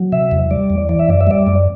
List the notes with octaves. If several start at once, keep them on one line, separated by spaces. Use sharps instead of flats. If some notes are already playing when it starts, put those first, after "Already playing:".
Already playing: F#3
C3 E5
E2
G3 D5
E2
E3 D5
E5
F#2 D5
E5
G3 D5
F#2